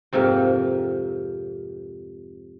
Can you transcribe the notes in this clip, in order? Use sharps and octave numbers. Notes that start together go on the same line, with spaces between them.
F2 G#2 C3 A#3 G4